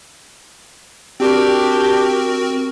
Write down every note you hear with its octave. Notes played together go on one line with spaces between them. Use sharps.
C4 D4 F#4 G4 A#4